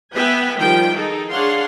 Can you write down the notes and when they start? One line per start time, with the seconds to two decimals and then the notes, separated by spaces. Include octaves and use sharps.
0.14 B3 B4 E5 G5 G#5
0.58 D#3 F3 G3 G5
0.97 D#4 G#4 A4
1.30 D4 G#4 C#5 F5 F#5 C6